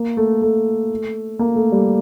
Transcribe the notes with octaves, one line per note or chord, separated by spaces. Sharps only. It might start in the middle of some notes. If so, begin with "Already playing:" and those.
Already playing: A#3
A3
A3
A#3
A3
G3